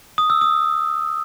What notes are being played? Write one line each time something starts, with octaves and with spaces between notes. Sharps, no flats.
D#6
E6
D#6